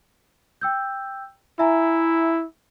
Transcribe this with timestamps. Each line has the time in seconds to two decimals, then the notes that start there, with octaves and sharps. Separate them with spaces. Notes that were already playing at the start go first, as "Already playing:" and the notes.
0.61 G5 E6 G6
1.59 E4 E5 G#5 A#5